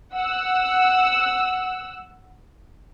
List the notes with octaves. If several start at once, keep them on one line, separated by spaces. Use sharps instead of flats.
F#5 E6